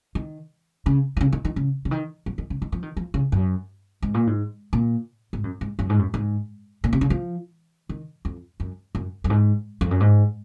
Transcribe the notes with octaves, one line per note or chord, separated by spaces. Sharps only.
D#3
C#3
D#3
C#3
D#3
D#3
C#3
C#3
D#3
F#3
D#3
C#3
D#3
F3
D#3
F3
C#3
F#2
G#2
A#2
G#2
A#2
G#2
F#2
G#2
F#2
G#2
F#2
G#2
A#2
C3
C#3
F3
D#3
F2
F#2
F#2
F#2
G#2
F2
F#2
G#2